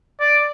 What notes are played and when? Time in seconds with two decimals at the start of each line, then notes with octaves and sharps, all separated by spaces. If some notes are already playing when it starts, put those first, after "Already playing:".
0.20 D5